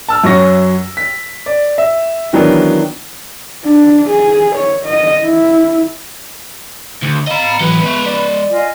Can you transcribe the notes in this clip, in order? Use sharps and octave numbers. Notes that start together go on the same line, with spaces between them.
A5 E6 F6
F#2 F#3 C#5 C#6 A#6
B6
D5
E5
D#3 E3 F#3 B3 D4 A#4
D4
G#4
C#5
D#5
E4
D2
D#5 F5 A#5 B5 A6
E3 F#3 A4 B4 B5
G#3 B3 E5
D5
F4 D#5 G#5